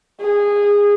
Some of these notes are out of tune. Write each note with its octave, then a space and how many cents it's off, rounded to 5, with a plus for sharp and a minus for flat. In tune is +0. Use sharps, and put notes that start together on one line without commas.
G#4 -20